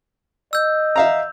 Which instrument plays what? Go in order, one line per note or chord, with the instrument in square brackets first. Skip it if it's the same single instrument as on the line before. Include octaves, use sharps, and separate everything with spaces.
[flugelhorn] D#5 [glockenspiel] E6 G6
[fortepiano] E5 F5 A#5